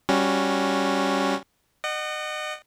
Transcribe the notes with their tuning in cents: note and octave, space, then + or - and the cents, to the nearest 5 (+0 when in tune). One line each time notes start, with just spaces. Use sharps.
G3 +0 C#4 +0 F#4 -15
D#5 -35 F#5 +20